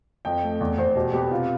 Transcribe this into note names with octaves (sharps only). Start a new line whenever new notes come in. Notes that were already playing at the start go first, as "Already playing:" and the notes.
F2 G5
A3
E2
E2 C5
B2 G4
B3 G4
C3 F4